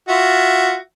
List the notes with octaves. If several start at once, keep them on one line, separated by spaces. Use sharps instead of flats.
F4 F#4 E5